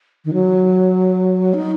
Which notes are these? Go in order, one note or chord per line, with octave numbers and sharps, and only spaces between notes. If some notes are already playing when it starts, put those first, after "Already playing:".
D#3
F#3
D#4